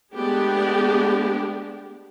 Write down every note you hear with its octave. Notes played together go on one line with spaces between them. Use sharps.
G#3 A3 B3 D4 G4 G#4